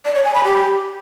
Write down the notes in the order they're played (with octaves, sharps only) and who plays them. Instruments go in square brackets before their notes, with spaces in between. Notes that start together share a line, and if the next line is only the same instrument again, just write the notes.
[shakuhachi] D5
C#5
G#5
B5
G4